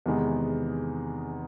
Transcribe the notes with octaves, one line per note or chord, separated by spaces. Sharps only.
E2 C3 D#3 G#3 B3